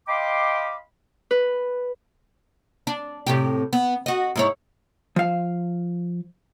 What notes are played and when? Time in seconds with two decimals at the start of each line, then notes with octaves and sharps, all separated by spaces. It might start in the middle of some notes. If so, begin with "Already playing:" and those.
0.08 D#5 F5 G5 B5 C6 D6
1.31 B4
2.87 D4
3.27 A2 C3 G4
3.73 B3
4.06 F#4 D#5
4.36 G#2 E4 C#5
5.16 F3 F5